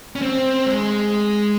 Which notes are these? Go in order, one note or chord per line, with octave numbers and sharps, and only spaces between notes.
C#4
C4
G#3